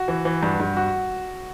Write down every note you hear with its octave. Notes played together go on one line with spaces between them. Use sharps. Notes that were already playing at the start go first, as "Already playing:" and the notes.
Already playing: F#4
E3
E3
G2
G2
F#4